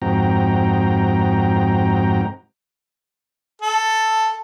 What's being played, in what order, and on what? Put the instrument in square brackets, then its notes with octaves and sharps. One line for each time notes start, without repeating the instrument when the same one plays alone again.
[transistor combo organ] F2 G#2 C4 F#4 G5 A#5
[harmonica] A4